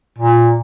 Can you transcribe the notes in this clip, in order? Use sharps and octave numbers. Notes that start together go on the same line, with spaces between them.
A#2